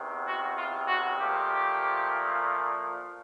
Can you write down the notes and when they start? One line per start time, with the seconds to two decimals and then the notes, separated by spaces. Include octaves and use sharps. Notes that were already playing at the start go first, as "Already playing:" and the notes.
Already playing: E2 C3 D#3
0.25 F#4
0.57 F4
0.87 F#4
1.19 A#2 F3 A3 G4